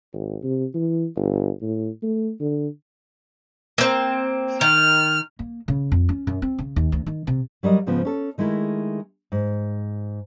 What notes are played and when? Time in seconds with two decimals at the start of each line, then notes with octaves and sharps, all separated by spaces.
0.13 G#1
0.43 C3
0.74 E3
1.16 G1
1.61 A2
2.03 A3
2.40 D3
3.78 A#3 C4
4.61 D#3 F6
5.39 A#3
5.68 C#3
5.92 F2
6.09 C#4
6.27 F#2
6.42 C4
6.58 C#3
6.76 D#2
6.92 D2
7.06 D#3
7.27 C3
7.63 F#3 G3 A#4 D#5
7.86 G#2 C#3 F3 B3
8.05 C#4 A4
8.38 D#3 G#3 A3 E4 A#4
9.32 G#2